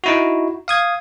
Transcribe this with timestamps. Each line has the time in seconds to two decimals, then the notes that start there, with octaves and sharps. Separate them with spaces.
0.04 D#4 E4 F#4
0.68 F5 D#6 G#6